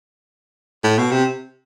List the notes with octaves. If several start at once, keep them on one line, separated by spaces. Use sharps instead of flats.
A2
B2
C3